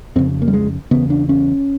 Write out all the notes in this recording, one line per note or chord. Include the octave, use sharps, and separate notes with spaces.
F2 C#3 C4
A#3
G3
G#3
E2 C#3 B3
D4
C#4